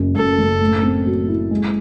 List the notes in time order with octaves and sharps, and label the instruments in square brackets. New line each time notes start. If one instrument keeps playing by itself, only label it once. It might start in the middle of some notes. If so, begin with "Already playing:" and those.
Already playing: [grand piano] F#1 F#2
[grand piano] F#2 [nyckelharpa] A4
[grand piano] F#1
A2
C4
F#3
E4
G#3